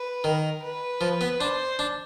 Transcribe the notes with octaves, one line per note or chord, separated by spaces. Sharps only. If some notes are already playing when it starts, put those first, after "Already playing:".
Already playing: B4
D#3 A#4
B4
F3
B3
D4 C5
D4